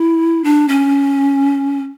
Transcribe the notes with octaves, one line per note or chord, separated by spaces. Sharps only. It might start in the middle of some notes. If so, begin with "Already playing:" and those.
Already playing: E4
D4
C#4